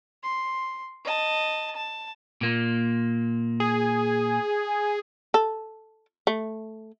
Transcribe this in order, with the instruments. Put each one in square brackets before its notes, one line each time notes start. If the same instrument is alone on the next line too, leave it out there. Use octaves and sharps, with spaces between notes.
[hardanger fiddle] C6
D#5 A5
A5
[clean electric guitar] A#2 A#3
[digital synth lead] G#4
[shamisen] A4
A3